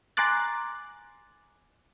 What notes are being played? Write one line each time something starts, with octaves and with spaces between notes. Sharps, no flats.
G#5 A#5 C6 D6 F#6 A6